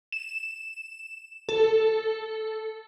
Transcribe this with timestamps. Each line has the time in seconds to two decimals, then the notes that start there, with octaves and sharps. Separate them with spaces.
0.12 E7
1.49 A4